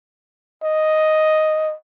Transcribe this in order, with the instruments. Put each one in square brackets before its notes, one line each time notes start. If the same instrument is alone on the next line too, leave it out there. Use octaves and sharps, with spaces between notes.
[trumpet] D#5